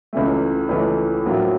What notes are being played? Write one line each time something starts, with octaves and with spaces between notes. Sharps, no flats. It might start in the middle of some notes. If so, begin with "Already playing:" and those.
C#2 C#3 E3 A3
C#2 C#3 E3 A3
A#1 A2 F#3 A#3